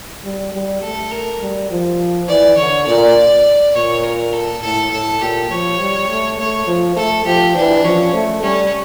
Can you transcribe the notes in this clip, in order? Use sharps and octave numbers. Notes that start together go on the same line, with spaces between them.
G3
G3
A3 A4
A#4
G3
F3
E3 D5
D3 C#5
A#2 D5
A#2 C#5
A#4
A4
A2 A4
A2 A4
A#2 G4
F3 C#5
G3
A3
A3 C#5
F3
A3 A4
F3 G4
E3 D4
F3 C#4
A3
G3 C#4